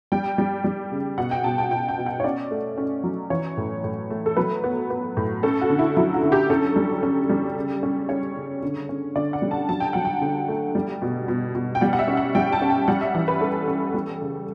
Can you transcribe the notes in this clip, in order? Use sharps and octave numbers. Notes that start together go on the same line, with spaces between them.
G3 G5
G3
G3
C#3
B2 F#5
G5
B2 A5
G5
B2 G5
G5
B2
F#5
C#5
C#4 D5
A3
C#4
F#3
E3 C#5
A2
A2
A3
A4
F#3 B4
B3
B3
A2
C#4 A4
F#4
D3
E4
F#3 E4
F#4
D3
G4
C#4 A4
G3
C#4
G3
C#3
C#4
C#4 C#5
C#3
D3
C#4
D3 D5
F#5
G3
A5
F#3 A5
G5
F#3 F#5
G5
D3
A3
G3
B2
B2
B2
G5
G3 F#5
F#5
E5
C#4
F#5
G3 G5
A5
C#4
G5
G3 F#5
E5
E3 F#5
B4
C#4 A4
C#4
G3
C#3